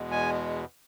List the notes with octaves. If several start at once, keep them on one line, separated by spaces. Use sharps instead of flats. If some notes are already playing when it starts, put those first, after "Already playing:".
Already playing: E2 B2 G#3
G#5